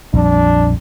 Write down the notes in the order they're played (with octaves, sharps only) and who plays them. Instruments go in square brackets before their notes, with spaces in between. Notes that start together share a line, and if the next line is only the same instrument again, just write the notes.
[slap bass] A#1 F2 G3 [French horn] D4